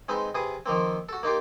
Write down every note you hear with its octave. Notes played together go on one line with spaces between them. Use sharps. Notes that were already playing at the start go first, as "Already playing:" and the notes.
G#3 C4 D#4 B4
C3 G#4 B4 D#6
D#3 F3 A#3 C4
F#4 A4
A#3 D#4 F4 G4